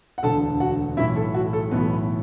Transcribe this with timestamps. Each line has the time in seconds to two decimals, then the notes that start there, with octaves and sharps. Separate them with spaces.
0.18 F#5
0.23 E1 D2 D3 A4 A5
0.60 F#4 F#5
0.97 B1 A2 E3 E4 E5
1.16 A4
1.34 F#4
1.53 A4
1.71 B1 A2 E3 B3 B4